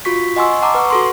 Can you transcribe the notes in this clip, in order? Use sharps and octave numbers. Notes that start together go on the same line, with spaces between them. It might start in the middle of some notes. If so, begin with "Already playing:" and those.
F4 F#4 C#6 B6
D#5 F#5 G#5 C6 C#6 E6
F#5 A5 A#5 D6 E6
B4 F#5 C#6
F#4 A4 C6